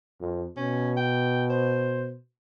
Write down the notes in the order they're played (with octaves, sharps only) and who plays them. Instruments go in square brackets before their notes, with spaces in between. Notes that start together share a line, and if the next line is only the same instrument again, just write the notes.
[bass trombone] F2
[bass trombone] B2 [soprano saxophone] C#4
[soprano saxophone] G5
C5